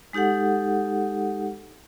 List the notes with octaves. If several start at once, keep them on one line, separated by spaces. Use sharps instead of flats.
G#3 D#4 G4 A4 F#5